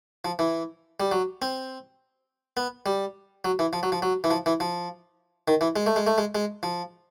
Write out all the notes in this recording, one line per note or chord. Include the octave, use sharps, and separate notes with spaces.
F3
E3
G3
F#3
C4
B3
G3
F#3
E3
F3
F#3
F3
F#3
E3
F3
E3
F3
D#3
E3
G#3
A3
G#3
A3
G#3
G#3
F3